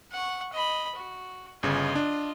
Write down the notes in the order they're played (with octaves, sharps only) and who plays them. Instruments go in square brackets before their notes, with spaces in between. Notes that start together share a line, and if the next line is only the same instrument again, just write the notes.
[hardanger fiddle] F#5 C#6
D#5 B5
F#4
[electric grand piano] G1 C#3 [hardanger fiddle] F4 D#5
[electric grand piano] D4